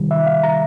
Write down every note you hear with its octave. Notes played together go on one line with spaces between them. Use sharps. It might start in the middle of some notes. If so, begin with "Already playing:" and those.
Already playing: C3 D#3 G3
E5
F5
A#5